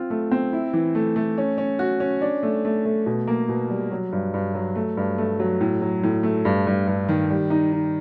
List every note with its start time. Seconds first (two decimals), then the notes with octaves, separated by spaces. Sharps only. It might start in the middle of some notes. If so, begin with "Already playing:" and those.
Already playing: C4 F4
0.10 A3
0.31 C4
0.53 E4
0.73 E3
0.95 A3
1.16 A3
1.38 C#4
1.58 C#4
1.79 F#4
2.00 C#4
2.21 D4
2.43 A3
2.65 A3
2.85 A3
3.06 B2
3.27 A#3
3.49 B2
3.70 G3
3.91 F#3
4.12 G2
4.34 G2
4.55 F#3
4.76 A3
4.97 G2
5.18 A3
5.39 F#3
5.61 A2
5.81 F#3
6.03 A2
6.23 A3
6.45 G2
6.67 G2
6.87 G2
7.09 D#3
7.30 G3
7.50 D#4
7.72 D#4